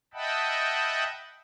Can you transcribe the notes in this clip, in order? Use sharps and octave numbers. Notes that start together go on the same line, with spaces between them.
D#5 E5 F#5 G5 A5 B5